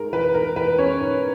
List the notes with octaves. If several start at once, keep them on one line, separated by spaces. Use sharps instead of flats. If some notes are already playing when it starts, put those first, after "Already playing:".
Already playing: G#2 G#3 A#4
E3 B4
G#2 A#4
E3 B4
G#3 C#4 C#5
G#2